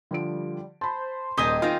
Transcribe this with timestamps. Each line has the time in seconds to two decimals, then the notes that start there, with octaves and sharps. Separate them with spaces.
0.11 D3 F3 G3 D7
0.81 C5 A5 B5
1.37 D#1 G4 G#4 D#5 D#6 G6 B6 G7
1.62 D#3 C4 F4 A#4